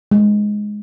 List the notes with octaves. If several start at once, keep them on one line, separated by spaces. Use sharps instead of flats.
G#3